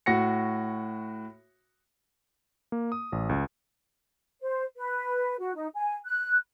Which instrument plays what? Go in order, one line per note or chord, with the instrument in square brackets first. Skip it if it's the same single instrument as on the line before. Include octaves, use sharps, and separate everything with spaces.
[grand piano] A2 F#4 A#6 C#7
[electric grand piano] A#3
D#6
A1
C#2
[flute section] C5
B4
F#4
D#4
G#5
F#6